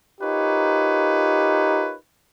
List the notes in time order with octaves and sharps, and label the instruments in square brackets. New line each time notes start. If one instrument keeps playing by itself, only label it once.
[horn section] D#4 F4 G4 A#4 B4 C#5